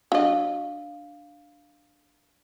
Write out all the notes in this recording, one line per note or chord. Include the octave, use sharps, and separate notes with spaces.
F#3 D4 D#5 F5